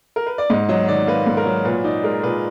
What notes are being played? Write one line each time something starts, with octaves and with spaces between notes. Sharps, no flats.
A#4
B4
D5
G#2 D#5
F#3 D#5
D#3 D5
A#3 B4
G#2
A#4
F#3
A#2 B4
D#4 D5
G#3 A#4
A#2 B4